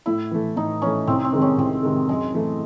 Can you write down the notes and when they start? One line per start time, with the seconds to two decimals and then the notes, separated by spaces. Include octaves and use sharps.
0.06 A2 E4
0.31 E3 A3
0.56 A2 D#4
0.82 E3 A3 C#4
1.07 C2 C4
1.25 C4
1.33 C3 D#3 G#3
1.42 C#4
1.58 C2 C4
1.83 C3 D#3 G#3
2.08 F#2 G#3
2.34 E3 A3